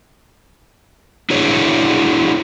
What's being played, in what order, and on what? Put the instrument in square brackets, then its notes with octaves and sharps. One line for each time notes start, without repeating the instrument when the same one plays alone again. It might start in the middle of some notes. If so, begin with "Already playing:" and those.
[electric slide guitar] D4 E4 F#4 G#4 C#5